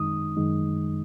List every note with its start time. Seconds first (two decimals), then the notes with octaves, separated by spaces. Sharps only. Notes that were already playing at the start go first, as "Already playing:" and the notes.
Already playing: F#2 D#3 G#3 D#4 D#6
0.37 F#2 D#3 G#3 D#4